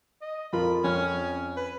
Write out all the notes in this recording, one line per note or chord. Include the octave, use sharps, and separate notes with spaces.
D#5
F2 F4 A#4 B5
F2 C#4 F6
B4